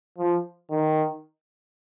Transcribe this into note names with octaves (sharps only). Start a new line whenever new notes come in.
F3
D#3